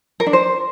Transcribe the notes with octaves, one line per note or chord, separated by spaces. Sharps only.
A#4
D4
C5